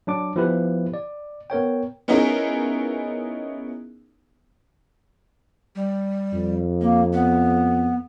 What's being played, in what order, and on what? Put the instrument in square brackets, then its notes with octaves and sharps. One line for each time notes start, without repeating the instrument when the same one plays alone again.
[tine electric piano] F#3 D4 D6
F3 B3 E4 G4 B4
D5
B3 A#4 C#5 G5
[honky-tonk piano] B3 C#4 D#4 E4 G#4 A#4
[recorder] G3
[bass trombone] F2
[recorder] A#3
B3